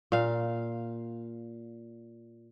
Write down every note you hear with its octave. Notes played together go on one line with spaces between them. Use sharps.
A#2 F5